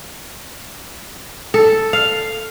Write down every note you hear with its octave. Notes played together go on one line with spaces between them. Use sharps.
A4
F5